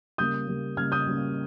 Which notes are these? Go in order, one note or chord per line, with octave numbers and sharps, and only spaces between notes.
C#3 G3 A#3 D#6 G6
C#3 G3 A#3
C#3 G3 A#3 F6 G#6
D#6 G6
C#3 G3 A#3